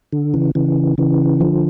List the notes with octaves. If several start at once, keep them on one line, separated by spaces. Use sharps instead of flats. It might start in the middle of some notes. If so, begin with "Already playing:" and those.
D3
C#3 E3
C#3 E3
C#3 E3
D3 F3